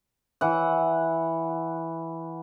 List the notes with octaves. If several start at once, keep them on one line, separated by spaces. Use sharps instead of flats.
E3 F#5